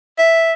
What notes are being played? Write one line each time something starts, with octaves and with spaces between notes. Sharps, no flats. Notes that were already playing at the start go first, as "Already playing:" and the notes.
E5